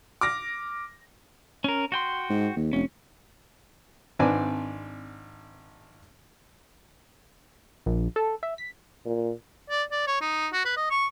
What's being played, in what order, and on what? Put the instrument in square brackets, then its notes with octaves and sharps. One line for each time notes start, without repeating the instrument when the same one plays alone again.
[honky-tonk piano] D6 F6 A#6
[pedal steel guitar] C#4 A#4
F#4 G5 C6
[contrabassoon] G#2
D#2
[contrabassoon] F1 [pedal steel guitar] C#4
[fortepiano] G#1 C4 D4 B4 D5 G#5
[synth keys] A#1
A4
E5
B6
[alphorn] A#2
[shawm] D5
D5
C#5
D#4
F#4
B4
D#5
C#6